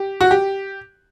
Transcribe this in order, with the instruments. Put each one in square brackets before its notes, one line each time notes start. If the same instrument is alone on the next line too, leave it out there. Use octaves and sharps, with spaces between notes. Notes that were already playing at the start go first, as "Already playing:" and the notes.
Already playing: [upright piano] G4
F#4
G4